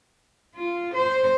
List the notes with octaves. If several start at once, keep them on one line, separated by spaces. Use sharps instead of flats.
F4
C5